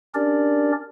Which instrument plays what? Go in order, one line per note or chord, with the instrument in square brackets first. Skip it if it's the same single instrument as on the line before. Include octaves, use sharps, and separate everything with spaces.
[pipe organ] C#4 D4 G4 A#4 D5